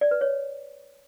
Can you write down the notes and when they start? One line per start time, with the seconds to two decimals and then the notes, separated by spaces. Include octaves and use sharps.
0.01 D5
0.11 B4
0.21 C#5